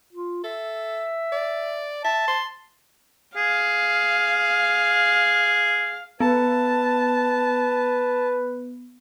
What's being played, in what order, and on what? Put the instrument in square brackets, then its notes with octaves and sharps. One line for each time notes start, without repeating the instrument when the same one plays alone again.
[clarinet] F4
[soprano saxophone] A4 [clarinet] E5
[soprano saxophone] D5
[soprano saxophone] E5 [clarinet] A5
[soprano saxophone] C6
[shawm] G#4 [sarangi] F5
[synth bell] B3 [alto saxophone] B4 [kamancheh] A5